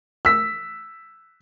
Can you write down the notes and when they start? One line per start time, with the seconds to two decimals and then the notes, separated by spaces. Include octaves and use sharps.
0.25 E6 B6